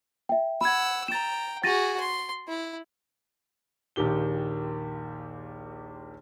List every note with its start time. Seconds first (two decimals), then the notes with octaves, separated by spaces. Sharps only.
0.29 E5 G5
0.61 F#5 B5 E6 G#6
1.08 G5 A#5 A6 E7
1.64 F#4 G#4 A6 A#6 D#7
2.00 C6
2.48 E4
3.96 A#1 D#2 D#3 G4 G7